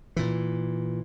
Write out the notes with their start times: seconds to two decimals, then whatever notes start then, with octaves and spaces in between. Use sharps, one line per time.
0.16 A#2 E3